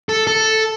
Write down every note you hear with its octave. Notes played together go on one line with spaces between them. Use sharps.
A4
A4